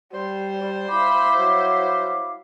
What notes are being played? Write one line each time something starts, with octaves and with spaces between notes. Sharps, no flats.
G3 C5
E4 F5 B5 D6
F#3